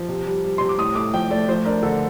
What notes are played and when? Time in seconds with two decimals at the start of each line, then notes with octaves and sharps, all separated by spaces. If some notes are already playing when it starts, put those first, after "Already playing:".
Already playing: F3
0.09 C3
0.26 G3
0.44 G3
0.58 C3 C6
0.69 D6
0.78 A2 D#6
0.95 A3 D6
1.14 F3 G5
1.31 A3 D5
1.48 F3 C5
1.65 D4 A#4
1.83 D3 A4